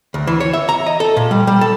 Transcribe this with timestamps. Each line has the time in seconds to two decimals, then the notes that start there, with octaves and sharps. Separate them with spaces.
0.14 D2
0.27 E3
0.40 C#5
0.53 E5
0.69 A#5
0.86 D#5
1.00 A4
1.17 A#2
1.31 G3
1.47 G3
1.61 A4